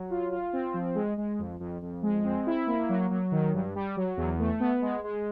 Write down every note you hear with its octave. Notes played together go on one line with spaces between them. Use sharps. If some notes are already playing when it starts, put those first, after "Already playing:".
Already playing: F#3
F4
F4
C4
F3
G#3
G#3
F2
F2
F2
G#3
C4
E4
A#3
F#3
F#3
D#3
G2
G3
F#3
E2
A3
B3
G#3
G#3